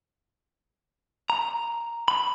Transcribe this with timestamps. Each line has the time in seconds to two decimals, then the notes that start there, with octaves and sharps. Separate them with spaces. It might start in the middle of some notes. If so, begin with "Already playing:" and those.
1.30 A#5
2.08 B5